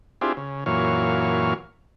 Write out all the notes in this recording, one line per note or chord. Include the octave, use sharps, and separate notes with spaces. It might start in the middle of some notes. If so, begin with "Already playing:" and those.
C4 D4 E4 F4 G4 G#4
C#3
F#2 A#2 E3 C#5 F5